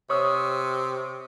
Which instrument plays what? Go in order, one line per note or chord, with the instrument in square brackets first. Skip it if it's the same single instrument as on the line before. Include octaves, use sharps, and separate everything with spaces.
[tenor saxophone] C3 [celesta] C5 C#5 [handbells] C#6 D#6 E6